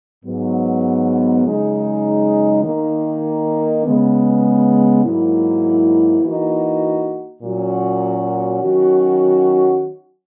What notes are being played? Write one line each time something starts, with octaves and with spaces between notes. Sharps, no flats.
G#2 F#3 B3
F#2 C#3 G#3 D#4 G#4
D#3 A#3 D#4
C#3 G#3 B3
G#2 F#3 A#3 E4
E3 A#3 D#4 F#4
A#2 F#3 C#4 F#4
D#3 F#3 C#4 F#4